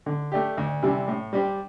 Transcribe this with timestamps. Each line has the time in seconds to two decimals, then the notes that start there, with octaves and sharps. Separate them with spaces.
0.06 D3
0.32 A3 D4 G4
0.58 D2
0.83 C3 E3 G3 D4
1.08 A2
1.33 G3 D4 G4 C5